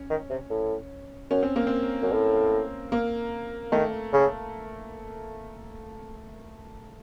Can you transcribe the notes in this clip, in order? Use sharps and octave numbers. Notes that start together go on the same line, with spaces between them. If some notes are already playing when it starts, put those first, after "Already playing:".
Already playing: C#4
D#3
C3
A2
F#2 C#4
C4
A#3
C4
F#2
A2
A#3
D#3 A3
C#3